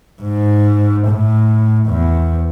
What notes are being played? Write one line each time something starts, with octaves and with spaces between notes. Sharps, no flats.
G#2
A2
E2